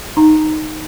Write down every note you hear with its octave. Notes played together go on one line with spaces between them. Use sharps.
D#4 A#5